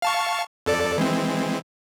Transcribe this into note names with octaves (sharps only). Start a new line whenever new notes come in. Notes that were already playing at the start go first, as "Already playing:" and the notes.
F5 A5 C#6
F2 A4 D5
E3 G#3 C4